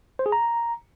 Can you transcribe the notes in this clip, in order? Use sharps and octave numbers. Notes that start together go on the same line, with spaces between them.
C5
G#4
A#5